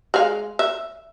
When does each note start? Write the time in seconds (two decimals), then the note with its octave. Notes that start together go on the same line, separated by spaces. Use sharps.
0.14 G#3 F5
0.59 E5